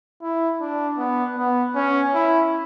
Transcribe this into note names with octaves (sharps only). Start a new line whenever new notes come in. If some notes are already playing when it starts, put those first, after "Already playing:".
E4
D4
B3
B3
C#4
E4